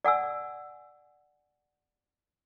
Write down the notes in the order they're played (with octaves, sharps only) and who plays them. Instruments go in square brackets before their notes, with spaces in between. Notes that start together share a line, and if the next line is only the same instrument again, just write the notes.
[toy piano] D5 F#5 G#5 E6